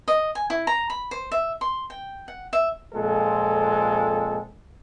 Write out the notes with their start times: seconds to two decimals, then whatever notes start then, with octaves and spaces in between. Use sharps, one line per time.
0.08 D#5
0.35 G#5
0.50 E4
0.67 A#5
0.90 B5
1.11 C5
1.32 E5
1.61 C6
1.90 G5
2.28 F#5
2.53 E5
2.94 F2 A#2 G#3 C4 A4